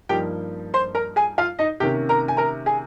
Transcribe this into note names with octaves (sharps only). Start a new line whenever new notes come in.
G2 F3 A#3 D#4 G4 G5
C5 C6
A#4 A#5
G#4 G#5
F4 F5
D#4 D#5
C3 D#3 A#3 C#4 G4 G5
A#4 A#5
G#5
A#4 A#5
G#4 G#5